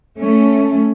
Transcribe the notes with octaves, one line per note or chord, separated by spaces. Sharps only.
A3 C#4